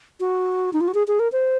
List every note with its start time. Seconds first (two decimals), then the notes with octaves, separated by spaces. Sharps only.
0.20 F#4
0.73 D#4
0.81 F4
0.88 F#4
0.94 G#4
1.08 G#4
1.19 A#4
1.32 C5